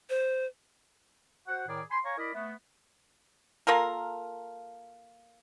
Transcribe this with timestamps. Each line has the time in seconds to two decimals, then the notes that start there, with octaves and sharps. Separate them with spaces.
0.10 C5
1.48 F#4 C5 F#5
1.68 A2 D#3 G#4 A#4 D5
1.91 G#5 B5 C6
2.05 C#5 F5 G#5 A#5 C#6
2.18 E4 A#4 D5 D#5 B5
2.34 A3 B3
3.67 A#3 F4 A4 A#4